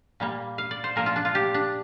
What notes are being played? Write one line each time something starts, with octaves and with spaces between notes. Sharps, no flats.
A#2 G3 A#3
F5
D5
C5
A#2 F3 A#3 A#4
F4
D4
F4
G4
D4